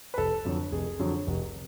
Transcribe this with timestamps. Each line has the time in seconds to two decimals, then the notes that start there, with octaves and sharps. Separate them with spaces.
0.14 B4
0.18 F1 A4
0.45 F2 D3 F#3
0.72 F1 G#4
0.99 F2 D3 F#3
1.27 F1